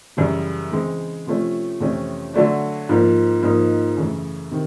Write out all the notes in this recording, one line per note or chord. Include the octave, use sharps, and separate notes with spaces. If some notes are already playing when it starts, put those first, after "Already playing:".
F#2 C#3 E3 G3
C#3 E3 G#3 C4
C3 F3 A3 C#4
F2 C3 E3 A3 C#4
D3 F#3 A3 D4
G#2 F3 A#3
G#2 F3 A#3 D#4
F#2 C#3 E3 A3
C3 D#3